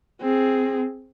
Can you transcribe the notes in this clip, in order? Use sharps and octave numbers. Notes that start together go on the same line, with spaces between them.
C4 G#4